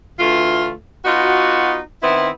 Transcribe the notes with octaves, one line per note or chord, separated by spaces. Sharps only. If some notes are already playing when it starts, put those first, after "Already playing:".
D2 E3 A3 F4
B3 D#4 F4 F#4
D#3 B3 C4 E4